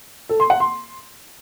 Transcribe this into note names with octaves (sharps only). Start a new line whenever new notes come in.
A4
C6
F#5
C6